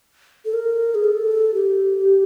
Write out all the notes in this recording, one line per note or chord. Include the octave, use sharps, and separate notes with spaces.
A4
A#4
G#4
A4
G4